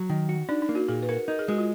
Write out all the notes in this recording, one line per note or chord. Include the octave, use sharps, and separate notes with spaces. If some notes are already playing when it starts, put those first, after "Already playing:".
Already playing: F#3
D#3
F#4
D4 D#4
D#4
A#3
F#4
A#2 G#4
B4
F#4 A#4
D#4 A#4
G#4
G#3 F#4
F4